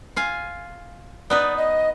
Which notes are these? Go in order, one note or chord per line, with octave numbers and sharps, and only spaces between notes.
F4 F5 G#5
B3 D#4 B4 D5
D#5